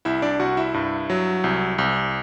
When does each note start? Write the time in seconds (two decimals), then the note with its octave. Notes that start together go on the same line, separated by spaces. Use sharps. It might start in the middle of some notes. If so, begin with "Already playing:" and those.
0.05 C2 E4 E5
0.22 D4 D5
0.40 C2 F#4 F#5
0.57 E4 E5
0.74 G2
1.10 F#3
1.44 C2
1.78 C2